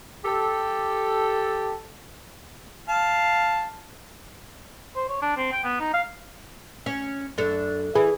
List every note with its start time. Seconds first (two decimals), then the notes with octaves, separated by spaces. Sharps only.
0.25 G4 A4
2.89 F5 A5
4.96 C5
5.09 C#5
5.22 D4
5.37 C4
5.52 G5
5.64 B3
5.80 D#4
5.94 F5
6.86 C#4
7.38 F#2 D4 A4
7.95 E3 G#4